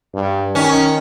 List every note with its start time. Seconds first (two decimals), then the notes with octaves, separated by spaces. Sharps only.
0.14 G2
0.55 D#3 C#4